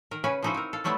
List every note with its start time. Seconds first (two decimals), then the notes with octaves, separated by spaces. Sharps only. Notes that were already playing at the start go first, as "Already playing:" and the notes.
0.11 D#3 A#4
0.24 C#3 C#4 B4 G#5
0.43 F3 C#4 D#4 E4 F#4 C5
0.54 C4 A#4
0.73 A4 F5
0.84 F#3 G3 A3 B3 E4 F4